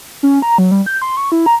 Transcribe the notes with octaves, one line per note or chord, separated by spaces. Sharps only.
C#4
A#5
F#3
G3
G6
C6
C#6
E4
A#5